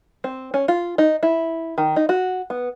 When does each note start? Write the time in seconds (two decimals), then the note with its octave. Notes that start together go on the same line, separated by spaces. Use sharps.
0.24 C4
0.54 C#4
0.68 F4
0.98 D#4
1.23 E4
1.78 D#3
1.96 D#4
2.09 F#4
2.50 B3